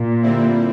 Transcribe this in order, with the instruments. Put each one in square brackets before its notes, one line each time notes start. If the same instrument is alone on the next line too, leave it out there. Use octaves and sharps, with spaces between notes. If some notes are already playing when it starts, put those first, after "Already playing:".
Already playing: [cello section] A#2
[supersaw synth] D3 G3 C4 E4